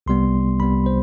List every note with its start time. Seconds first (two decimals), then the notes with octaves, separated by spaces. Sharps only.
0.06 C2 C3 G3 B3 C6
0.60 C2 C3 G3 B3 B5
0.86 C5